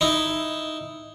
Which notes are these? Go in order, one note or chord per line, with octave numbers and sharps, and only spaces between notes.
D#4 E4